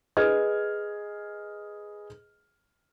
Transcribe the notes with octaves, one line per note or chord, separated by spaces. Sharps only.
G#4 B4 D#5 F6 G#6